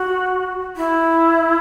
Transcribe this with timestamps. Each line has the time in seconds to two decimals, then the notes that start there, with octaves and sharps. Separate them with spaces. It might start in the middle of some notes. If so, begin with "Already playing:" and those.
Already playing: F#4
0.77 E4